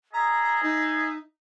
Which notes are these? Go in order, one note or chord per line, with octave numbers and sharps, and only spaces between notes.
G#4 D#5 E5 A#5
D#4